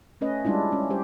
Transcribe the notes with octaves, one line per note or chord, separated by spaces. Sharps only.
A3 C#4 B4 D#5
G3 G#3 D4 E4 F4
C#4
G3 G4 C5